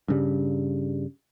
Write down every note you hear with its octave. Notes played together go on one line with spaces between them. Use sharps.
G2 C#3 G3